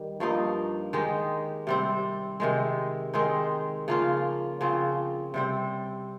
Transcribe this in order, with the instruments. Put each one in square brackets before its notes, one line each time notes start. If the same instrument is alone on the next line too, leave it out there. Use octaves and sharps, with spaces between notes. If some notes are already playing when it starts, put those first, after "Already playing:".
Already playing: [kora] D#3 G3
G2 F3 A#3 D#4
D#3 G#3 D#4 G4
C3 G3 C4
C3 D#3 G#3
D#3 G#3 C4 D#4
C#3 F3 A#3 F4
C#3 F3 C4
C3 G3 C4